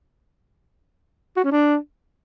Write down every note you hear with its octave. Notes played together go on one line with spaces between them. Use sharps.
F#4
C#4
D4